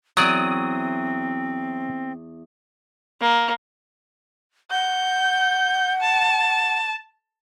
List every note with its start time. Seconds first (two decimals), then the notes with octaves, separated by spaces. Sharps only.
0.17 E2 F#3 C4 D5 D#6
3.21 A#3
4.71 F#5 G6
6.01 A5